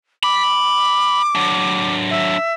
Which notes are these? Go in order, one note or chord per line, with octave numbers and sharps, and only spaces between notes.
B5 D6
F#3 D4
E5